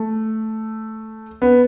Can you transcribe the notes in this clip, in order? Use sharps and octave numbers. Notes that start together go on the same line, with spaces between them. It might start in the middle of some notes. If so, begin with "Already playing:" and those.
Already playing: A3
B3